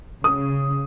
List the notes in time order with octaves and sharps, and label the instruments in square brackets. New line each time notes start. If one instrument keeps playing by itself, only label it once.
[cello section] C#3 [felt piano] D#6